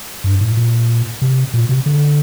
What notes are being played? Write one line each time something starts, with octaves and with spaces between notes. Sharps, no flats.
G2
A2
A#2
C3
A#2
C3
D3